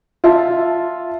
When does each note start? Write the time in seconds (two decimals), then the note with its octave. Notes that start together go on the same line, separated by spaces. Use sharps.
0.24 F4 E5 A5